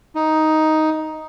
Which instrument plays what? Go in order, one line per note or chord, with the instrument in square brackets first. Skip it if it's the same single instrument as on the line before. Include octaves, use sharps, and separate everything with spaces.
[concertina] D#4